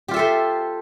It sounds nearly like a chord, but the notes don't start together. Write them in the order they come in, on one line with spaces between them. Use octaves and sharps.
G4 F4 E5 A4 C5